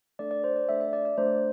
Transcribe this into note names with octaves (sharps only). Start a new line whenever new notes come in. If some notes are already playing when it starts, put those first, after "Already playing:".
A3 D4 A4 D5
D5
C5
D5
A3 D4 A4 E5
E5
D5
D5
A3 D4 A4 C5